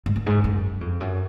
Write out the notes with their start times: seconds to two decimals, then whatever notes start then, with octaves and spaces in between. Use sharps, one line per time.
0.06 G#2
0.16 F#2
0.26 G#2
0.44 F#2
0.81 F2
1.00 F#2